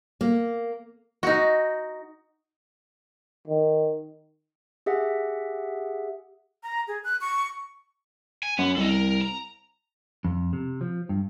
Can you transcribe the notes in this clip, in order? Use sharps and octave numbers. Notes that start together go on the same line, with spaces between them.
A#3
D#4 F#4
D#3
G4 G#4 E5 F#5
A#5
G#4
F#6
C#6
G#5
F#2 B3
C2 A4 D#5
A#4
A#5
F2
C3
F3
G2